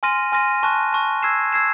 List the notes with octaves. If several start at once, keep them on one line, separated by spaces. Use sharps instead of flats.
G#5 C6 F6 A#6 D#7
G#5 C6 F6 A#6 D#7
A5 C#6 F#6
A5 C#6 F#6
E6 G#6 C7 E7
E6 G#6 C7 E7